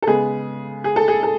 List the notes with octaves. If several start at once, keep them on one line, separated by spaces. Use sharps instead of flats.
A4
C#3 G#3 B3 G#4
G#4
A4
G#4
A4